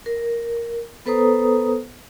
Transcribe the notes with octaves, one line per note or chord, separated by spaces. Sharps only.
A#4
B3 A4 B4 C5 A#5 D#6